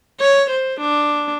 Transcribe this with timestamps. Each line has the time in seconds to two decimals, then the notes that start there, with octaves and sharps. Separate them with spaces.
0.20 C#5
0.50 C5
0.80 D4